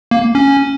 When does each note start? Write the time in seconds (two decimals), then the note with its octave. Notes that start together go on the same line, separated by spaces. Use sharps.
0.11 A#3
0.35 C#4